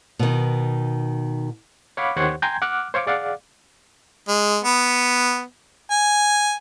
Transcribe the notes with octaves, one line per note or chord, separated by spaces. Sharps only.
B2 D#3
C#5 F5 F#5 B5 D6
D#2 D#3 G4 C5 C#5 F#5
G5 G#5 A#5 C6 G6 G#6
F#5 D6 F6 F#6
C5 C#5 F5 C#6 D6
G#4 D5 F5 F#5
G#3
B3
G#5